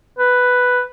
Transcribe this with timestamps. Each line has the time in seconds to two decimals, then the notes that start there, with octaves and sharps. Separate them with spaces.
0.19 B4